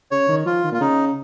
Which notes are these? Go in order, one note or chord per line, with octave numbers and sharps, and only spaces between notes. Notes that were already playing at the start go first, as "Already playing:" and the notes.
C#3 C#5
D#3
F3 F4
D#3
A#2 F4
C#3 D#4